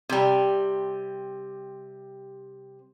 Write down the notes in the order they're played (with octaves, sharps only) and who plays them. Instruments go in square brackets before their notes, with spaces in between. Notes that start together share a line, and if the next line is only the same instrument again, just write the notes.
[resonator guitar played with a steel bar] C3 G3